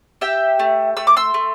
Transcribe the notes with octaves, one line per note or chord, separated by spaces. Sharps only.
G4 E5 G5
A3
A3 E6
D6
C6 E6
A3